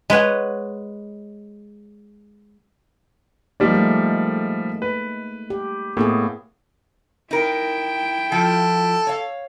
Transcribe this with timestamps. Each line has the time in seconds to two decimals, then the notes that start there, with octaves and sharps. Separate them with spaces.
0.10 G#3 B4 C#5 F#5
3.60 F3 G3 G#3 A#3 D#4 D5
3.74 A3
4.82 B4
5.50 G4
5.97 A2 A#3 B3 G#4
7.31 D#4 E4 A#4 G5
8.32 F3 F4 A4
9.07 C#5 F5